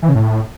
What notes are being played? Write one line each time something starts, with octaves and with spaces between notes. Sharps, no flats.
E3
C#3
A2